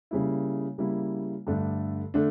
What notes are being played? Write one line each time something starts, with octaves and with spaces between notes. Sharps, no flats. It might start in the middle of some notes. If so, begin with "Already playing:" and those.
C#3 G3 A#3 E4
C#3 G3 A#3 E4
G2 D3 A3 D4
D3 A3 D4